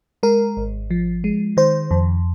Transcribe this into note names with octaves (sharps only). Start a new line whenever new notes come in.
G#3 A#4
G#1
F3
G#3
D#3 C5
F2